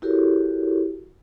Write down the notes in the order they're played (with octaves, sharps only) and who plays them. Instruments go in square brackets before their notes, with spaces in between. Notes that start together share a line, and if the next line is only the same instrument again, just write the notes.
[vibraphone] E4 F#4 G4 A4 A#4 C#5